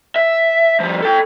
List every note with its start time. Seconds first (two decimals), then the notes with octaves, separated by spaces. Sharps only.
0.16 E5
0.80 F3 G3
1.03 A4 G5